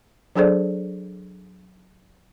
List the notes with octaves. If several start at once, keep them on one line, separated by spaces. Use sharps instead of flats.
F#3 D4 G#4 A4 C5 D5